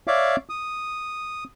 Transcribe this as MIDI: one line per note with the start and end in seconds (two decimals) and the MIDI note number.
0.07 0.36 73
0.07 0.36 74
0.07 0.36 76
0.07 0.36 77
0.07 0.36 86
0.49 1.44 87